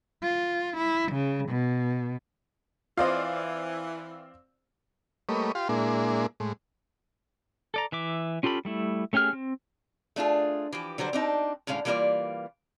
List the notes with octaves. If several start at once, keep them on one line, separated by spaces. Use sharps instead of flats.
F4
E4
C#3
B2
E3 C4 F4 D5 D#5 F5
G3 A3 A#3 B4 C#5 D#5
F4 G4 F5 C6
A#2 G#3 A#3 D4 E4 G#4
A2 G#3
A4 D5 A#5
E3 E5 D6
C#4 F4 G4 A4 B5
G3 A3 E4
A3 C#4 G4 G#4 F6
C4
A3 D4 F4 G#4
E3 F3 G4
D3 F#3 G3 C5
C4 D4 D#4
A2 D3 G#3 C#4 F5
E3 G3 A#3 D#4 F4 D5